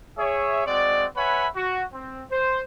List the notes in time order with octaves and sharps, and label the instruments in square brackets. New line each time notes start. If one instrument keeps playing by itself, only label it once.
[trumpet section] G#4 C#5 E5
G#3 C4 F#4 D5
B4 C#5 E5 F#5 G#5 B5
F#4
C4
C5